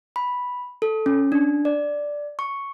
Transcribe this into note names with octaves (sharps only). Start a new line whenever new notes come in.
B5
A4
C#4
D4
D5
C#6